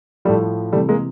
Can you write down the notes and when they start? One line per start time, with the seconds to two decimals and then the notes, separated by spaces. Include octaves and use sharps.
0.25 F3 G3 A3
0.29 A2
0.73 C3 E3 G3 A3
0.89 G#3 A#3